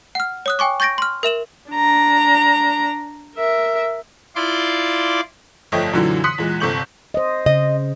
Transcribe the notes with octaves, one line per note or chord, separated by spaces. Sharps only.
F#5 F6
C#5 D#6 F#6
G5 G#5 C#6 D6
C#6 G6 A6 A#6 D7
C6 F6
A#4 E5 E7 F#7
D4 A#5
A#4 E5
E4 F4 D5 C6 D6
G1 F2 A3 C#5 D#5 G5
F#2 A#2 D3 E3 F#3
C6 D#6 F#6 B6 C#7
E2 A#2 G#3
G1 C3 A4 C#6 G6 F#7
C5 D#5
C#3 D#5